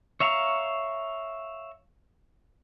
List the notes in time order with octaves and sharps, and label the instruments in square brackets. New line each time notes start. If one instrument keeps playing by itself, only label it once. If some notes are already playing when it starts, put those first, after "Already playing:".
[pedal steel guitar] C#5 E5 F5 A#5 C#6